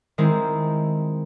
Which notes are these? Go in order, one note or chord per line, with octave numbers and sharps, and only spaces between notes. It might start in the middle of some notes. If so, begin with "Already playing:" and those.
D#3 G#3 C4 E4